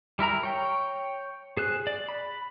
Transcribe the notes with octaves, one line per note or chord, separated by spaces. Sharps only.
G3 E4 A#4 A#5
C#5 G5
G#4 C5 F#6
D5
B5